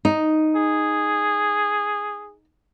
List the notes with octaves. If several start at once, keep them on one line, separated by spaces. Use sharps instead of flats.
D#4
G#4